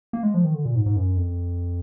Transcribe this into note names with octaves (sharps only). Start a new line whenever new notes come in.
A#3
G#3
F3
D#3
D3
A#2
G#2
G#2
F#2
F2